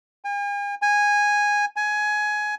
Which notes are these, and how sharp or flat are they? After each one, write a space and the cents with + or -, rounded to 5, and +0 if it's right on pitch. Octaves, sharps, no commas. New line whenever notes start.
G#5 -45
G#5 -10
G#5 +15